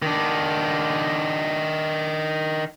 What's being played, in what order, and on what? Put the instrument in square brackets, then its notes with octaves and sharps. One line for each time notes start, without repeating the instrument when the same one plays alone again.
[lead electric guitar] D#3 D4